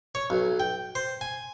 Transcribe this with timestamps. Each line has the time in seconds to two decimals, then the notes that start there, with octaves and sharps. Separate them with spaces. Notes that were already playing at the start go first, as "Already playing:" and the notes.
0.15 C#5
0.30 B1
0.60 G5
0.95 C5
1.21 G#5